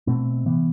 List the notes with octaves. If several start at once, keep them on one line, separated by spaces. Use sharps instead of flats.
B2 A3 C4
C3 E3 B3